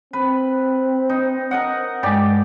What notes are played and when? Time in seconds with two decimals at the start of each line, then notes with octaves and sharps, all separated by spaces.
0.13 C4 B4
1.09 D#4
1.51 A#4 D#5 F#5
2.03 G2 G#3 G4 D5